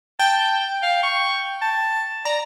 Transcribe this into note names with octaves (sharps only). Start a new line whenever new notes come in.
G5 A5
F5
C#6
A5
D5 A#5